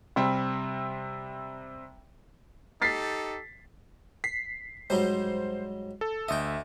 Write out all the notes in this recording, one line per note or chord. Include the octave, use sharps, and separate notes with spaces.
C3 G3 C4
D#4 G4 A4 A6 B6 C7
B6 C7
G#2 F#3 G3 C5
A4
D2 D#5 E5 G5